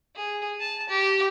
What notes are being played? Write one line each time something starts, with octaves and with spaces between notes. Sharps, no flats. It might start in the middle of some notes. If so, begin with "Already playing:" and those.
G#4
A5
G4